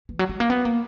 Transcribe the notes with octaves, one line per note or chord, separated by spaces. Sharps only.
E3
F#3
G#3
A#3
B3
A#3